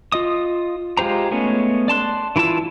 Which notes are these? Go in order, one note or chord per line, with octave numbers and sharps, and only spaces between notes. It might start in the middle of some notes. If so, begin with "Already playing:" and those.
F4 D#5 D#6
G#3 F4 G4 C5 A#5
G#3 A3 B3 C#4
D5 A5 C6 F#6
E3 E4 F4 A5 E6